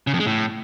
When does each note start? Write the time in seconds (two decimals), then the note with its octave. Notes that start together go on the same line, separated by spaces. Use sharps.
0.07 C#3
0.13 F2
0.20 G#3
0.26 A2